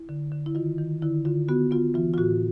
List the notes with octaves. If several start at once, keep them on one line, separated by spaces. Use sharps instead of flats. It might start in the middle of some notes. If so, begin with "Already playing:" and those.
Already playing: E4
D3
D3
E4
D#3 F4
D#3
D3 E4
D3 F4
B3 F#4
B3 F4
E3 F4
F4
A2 F#4